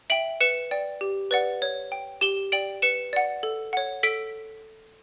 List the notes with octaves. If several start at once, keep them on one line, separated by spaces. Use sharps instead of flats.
E5 G5 D7 F#7
B4 C#7 E7
D5 G5
G4
B4 D5 F#5
C#5
G5
G4 E7 G7
D5 G5 D7 F#7
B4 C#7 E7
D5 F#5
A4
C#5 F#5
A4 B6 D7